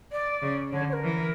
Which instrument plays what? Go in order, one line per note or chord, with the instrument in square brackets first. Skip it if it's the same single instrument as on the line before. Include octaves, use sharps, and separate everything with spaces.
[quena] D5
[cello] C#3
[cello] D3 [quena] C#5
[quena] C#5
A#4
[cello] E3